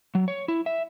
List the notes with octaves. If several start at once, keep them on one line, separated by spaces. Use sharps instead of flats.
F#3
C#5
E4
E5